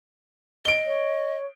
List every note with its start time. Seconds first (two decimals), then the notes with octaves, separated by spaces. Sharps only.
0.65 D#5 D7 G7
0.86 C#5